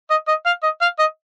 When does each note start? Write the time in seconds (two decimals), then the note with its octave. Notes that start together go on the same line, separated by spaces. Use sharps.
0.10 D#5
0.28 D#5
0.46 F5
0.63 D#5
0.82 F5
0.99 D#5